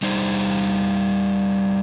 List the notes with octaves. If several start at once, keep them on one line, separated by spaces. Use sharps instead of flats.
G3 D#4 C5